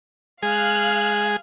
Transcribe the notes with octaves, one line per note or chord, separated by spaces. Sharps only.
G#3 G#4 F5 F6 F#6